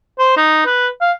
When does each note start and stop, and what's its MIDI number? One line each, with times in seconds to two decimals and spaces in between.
0.19 0.34 72
0.37 0.63 63
0.66 0.88 71
1.01 1.12 77